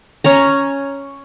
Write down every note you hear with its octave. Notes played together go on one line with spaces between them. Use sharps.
C#4 C#5 A#5